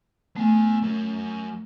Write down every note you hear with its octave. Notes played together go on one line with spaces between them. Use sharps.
A3 B3 G#5
F#3 A#4